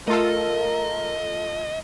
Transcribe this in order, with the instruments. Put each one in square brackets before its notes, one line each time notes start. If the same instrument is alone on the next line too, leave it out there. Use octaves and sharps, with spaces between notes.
[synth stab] A3 F4 A4 [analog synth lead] A#4 [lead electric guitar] D#5